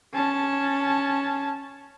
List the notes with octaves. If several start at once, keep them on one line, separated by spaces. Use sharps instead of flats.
C#4 A5